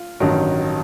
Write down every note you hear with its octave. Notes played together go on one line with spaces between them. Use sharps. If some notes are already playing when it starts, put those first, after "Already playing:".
Already playing: F4
A1 G2 D#3 F#3